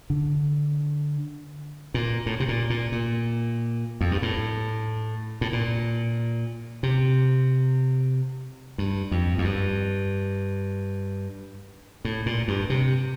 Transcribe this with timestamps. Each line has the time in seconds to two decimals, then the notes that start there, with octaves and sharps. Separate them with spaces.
0.10 D3
1.94 A#2
2.26 A2
2.40 C3
2.49 A#2
2.70 A#2
2.92 A#2
4.01 F2
4.11 G2
4.22 A2
5.41 A2
5.53 A#2
6.83 C3
8.78 G2
9.11 F2
9.38 F2
9.44 G2
12.05 A2
12.26 A#2
12.48 G2
12.70 C3